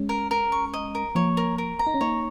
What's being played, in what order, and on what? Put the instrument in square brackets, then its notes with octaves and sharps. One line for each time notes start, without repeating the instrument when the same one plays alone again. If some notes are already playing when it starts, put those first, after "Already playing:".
Already playing: [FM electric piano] G#3 C#4
[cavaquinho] A#4
A#4
C#6
D#5
A#4
[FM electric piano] F3 A#3 [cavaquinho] C#5
[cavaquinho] A#4
A#4
A#5
[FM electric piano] D#4
C#4
[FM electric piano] A#3 D#4 [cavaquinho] C#5